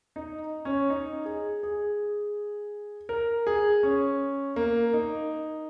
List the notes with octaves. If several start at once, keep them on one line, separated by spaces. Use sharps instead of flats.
D#4
C#4
D#4
G#4
G#4
A#4
G#4
C#4
A#3
D#4